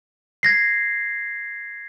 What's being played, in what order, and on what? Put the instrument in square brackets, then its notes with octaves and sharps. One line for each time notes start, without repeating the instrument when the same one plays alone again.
[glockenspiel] G#6 A#6 C7